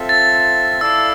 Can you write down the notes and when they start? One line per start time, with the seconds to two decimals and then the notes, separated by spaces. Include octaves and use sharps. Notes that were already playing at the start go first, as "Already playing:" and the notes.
Already playing: C4 F4 A4 E5
0.09 A6
0.81 E4 A4 D5 F5 A5 E6